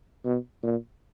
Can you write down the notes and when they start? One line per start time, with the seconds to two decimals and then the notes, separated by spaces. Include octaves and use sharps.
0.25 B2
0.63 A#2